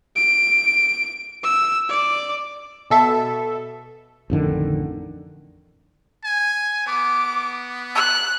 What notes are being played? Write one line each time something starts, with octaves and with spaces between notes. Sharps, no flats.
D7
E6
D5
B2 A4 E5
A1 F2 D3 D#3
G#5
B3 D6
F#6